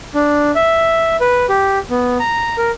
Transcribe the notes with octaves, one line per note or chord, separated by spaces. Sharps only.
D4
E5
B4
G4
B3
A#5
A#4